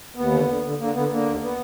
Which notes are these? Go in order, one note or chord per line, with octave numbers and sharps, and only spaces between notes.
D#2 B3
D3
D3
D3
D3 A#3
D3 B3
D3 A#3
D#2
B3